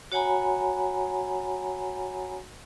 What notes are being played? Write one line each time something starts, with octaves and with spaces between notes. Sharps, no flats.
F#4 C#5 F#5 G#5 A#5 B5